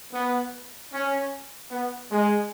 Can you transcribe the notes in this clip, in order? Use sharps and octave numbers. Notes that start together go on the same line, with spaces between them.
B3
C#4
B3
G#3